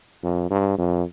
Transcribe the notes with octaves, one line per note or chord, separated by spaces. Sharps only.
F2
G2
F2